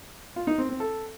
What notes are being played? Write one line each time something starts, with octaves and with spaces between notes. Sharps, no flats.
F4
D#4
C4
C4
A4